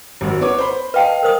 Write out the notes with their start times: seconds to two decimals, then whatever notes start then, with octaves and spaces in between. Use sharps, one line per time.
0.21 G#1 F#2
0.41 B3 C#5 D6
0.58 C5 B5
0.94 B4 D#5 F5 G5 A5
1.23 A#4 C5 D#6